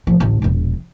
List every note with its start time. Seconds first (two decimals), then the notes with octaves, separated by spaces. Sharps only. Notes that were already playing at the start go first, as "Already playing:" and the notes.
0.07 A1 F3
0.20 A1 D2
0.42 E1 A#1